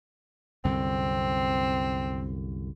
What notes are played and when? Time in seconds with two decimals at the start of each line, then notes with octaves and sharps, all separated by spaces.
0.65 C2 F#2 D3 C4